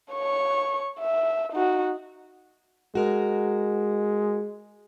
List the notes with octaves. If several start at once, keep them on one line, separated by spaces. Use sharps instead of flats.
C#5 C#6
E5
D#4 F#4
G#3 F#4 A#4